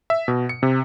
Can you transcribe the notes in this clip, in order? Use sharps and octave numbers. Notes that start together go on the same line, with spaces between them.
E5
B2
C#7
C3